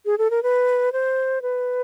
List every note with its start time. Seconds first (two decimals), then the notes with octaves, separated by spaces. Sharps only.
0.06 G#4
0.18 A4
0.30 A#4
0.43 B4
0.93 C5
1.42 B4